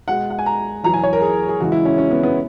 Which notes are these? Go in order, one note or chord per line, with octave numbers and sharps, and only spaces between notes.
B2 G#3 F#5
F#5
G#5
A#5
E2 B2 F#3 A#5
G#5
C#5
A#4
G#4
G#4
E2 C#3 E3 G#3 F#4
E4
C#4
C#4
B3
B3